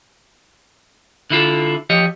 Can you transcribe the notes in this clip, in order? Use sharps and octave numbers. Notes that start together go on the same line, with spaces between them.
D3 E4 F4 A4
F3 G4 C#5 D#5